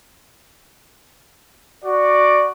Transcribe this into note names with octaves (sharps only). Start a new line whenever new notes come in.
F#4 D5